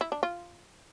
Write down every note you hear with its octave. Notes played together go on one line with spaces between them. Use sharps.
E4
D4
F4